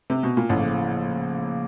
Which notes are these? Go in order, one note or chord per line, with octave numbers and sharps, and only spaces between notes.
C3
B2
A#2
A1 A2 C#3 F3 A#3